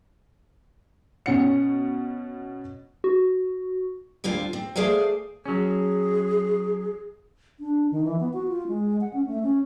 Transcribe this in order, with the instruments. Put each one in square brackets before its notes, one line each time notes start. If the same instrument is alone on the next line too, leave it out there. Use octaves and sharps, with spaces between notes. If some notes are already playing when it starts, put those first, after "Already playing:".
[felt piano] B2 C#4 C#5 F#5 C#7
[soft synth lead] F#4
[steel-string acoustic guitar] D2 G2 C4 F4 G#5
C4
A3 G#4 C5 D5 F5 G#5
[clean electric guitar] F#3 C#4 [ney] G#4
[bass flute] D4
D#3
E3
B3
F#4
F4
G#3
F#5
C#4
A3
C#4